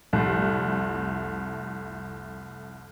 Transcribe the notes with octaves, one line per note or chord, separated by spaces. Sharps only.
C2 F2 A3